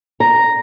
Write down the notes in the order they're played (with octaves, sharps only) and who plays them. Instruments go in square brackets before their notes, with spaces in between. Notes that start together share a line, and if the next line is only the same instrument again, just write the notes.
[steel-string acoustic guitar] A#5